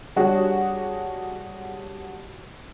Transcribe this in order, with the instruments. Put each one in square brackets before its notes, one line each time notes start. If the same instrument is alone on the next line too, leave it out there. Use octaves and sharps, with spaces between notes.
[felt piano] G3 D4 F#4 G#4 C#5